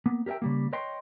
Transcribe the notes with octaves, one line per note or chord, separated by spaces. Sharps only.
A#3 B3
G4 A#4 C5 E5 G5
C#3 G3 A#3
B4 C#5 D#5 G5 C6